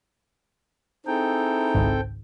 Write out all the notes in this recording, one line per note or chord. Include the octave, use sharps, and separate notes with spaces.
C4 D#4 E4 G#4 A4 G5
G#1 C#2 G#2